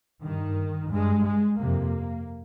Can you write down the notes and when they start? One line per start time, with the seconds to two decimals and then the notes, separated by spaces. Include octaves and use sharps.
0.23 G2 D#3
0.91 G2 G#3
1.26 G#3
1.59 F2 C3 A#3